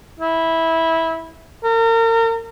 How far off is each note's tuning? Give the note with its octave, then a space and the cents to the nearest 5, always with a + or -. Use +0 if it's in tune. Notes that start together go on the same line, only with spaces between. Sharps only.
E4 -15
A#4 -35